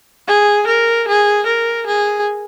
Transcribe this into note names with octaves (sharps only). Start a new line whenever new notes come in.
G#4
A#4
G#4
A#4
G#4